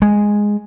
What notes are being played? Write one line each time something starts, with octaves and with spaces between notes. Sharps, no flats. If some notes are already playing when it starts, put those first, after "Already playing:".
G#3